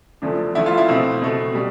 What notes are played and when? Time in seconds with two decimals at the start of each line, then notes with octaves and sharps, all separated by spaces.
0.22 E2 D3 F3 A3 D4
0.55 E2 D3 F3 A3 E4
0.66 F4
0.78 E4
0.88 B2 A3 C4
1.21 B2 A3
1.54 B2 G3